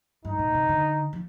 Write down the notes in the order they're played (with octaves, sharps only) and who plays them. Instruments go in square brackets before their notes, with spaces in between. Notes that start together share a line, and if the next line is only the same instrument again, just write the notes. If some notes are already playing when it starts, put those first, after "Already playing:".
[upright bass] G2 [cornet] D#4
[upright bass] A#2
C3
D3
F3